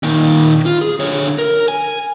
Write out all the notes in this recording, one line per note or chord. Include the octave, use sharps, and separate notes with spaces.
A#2 D#3
F4
G#4
D3 C#5
A#4
G#5